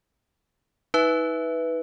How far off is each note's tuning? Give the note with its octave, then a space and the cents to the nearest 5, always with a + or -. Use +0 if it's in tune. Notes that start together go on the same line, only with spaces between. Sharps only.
D#4 +40 B4 +0 E5 +0